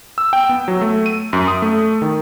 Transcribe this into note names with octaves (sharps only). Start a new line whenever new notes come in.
E6
G5
B3
F#3
A3
D#7
F#2
D#6
A3
D#3